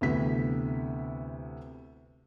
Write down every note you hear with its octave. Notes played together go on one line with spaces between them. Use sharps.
D2 C3 E3 B3 B6